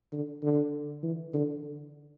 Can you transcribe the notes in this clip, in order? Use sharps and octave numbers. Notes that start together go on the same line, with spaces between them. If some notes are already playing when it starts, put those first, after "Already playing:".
D3
D3
E3
D3